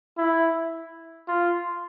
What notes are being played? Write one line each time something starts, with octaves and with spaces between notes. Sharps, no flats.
E4
F4